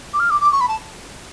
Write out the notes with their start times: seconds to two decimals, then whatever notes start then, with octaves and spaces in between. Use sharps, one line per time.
0.14 D6
0.20 F6
0.30 D6
0.41 D6
0.52 C#6
0.61 B5
0.68 A5